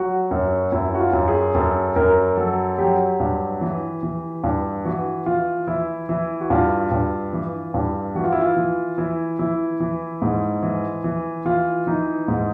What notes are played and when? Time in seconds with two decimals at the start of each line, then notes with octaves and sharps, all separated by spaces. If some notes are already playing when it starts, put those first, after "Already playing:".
Already playing: F#3 F#4
0.31 F#2
0.72 F#2 E4
0.95 F#4
1.00 F4
1.13 F#2
1.28 G#4
1.55 F#2 A4
1.96 F#2 A#4
2.37 F#3 A4
2.78 F#3 G4
3.20 G2
3.61 E3
4.03 E3
4.44 G2
4.85 E3 F#4
5.26 E3 F4
5.67 E3 E4
6.09 E3 E4
6.41 F#4
6.50 G2 F4
6.91 G2
7.33 E3
7.74 G2
8.15 E3 F#4
8.24 F4
8.32 E4
8.41 F4
8.56 E3
8.98 E3 E4
9.39 E3 E4
9.80 E3
10.22 G#2
10.63 E3
11.04 E3
11.45 E3 F4
11.87 E3 D#4
12.28 G#2